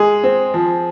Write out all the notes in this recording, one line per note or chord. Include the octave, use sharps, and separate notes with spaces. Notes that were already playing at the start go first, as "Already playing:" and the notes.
Already playing: G#3 G#4
C4
F3